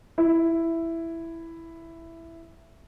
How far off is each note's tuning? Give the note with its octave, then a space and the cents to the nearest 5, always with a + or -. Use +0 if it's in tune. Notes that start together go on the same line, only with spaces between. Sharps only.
E4 +5